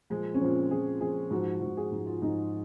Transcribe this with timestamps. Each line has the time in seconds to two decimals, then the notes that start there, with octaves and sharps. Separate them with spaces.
0.10 A#2 F3 G#3
0.34 C#4
0.41 A#2 F3 C4
0.71 A#2 F3 G#4
1.01 A#2 F3 G#4
1.31 G#2 F3 F#4
1.61 G#2 F3 F#4
1.77 G#4
1.92 G#2 F3
2.06 F4
2.22 G#2 F3 D#4